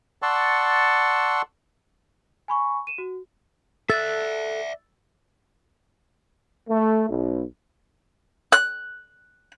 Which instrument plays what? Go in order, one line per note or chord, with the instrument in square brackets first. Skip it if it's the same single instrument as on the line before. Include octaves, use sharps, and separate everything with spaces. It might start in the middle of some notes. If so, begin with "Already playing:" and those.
[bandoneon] D5 F#5 A5 C6 C#6 E6
[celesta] G#5 B5 C#6
D#7 E7
F#4
[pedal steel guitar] A4 F#6 [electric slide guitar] D5 E5 [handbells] E6 A6
[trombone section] A3
B1
[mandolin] F#6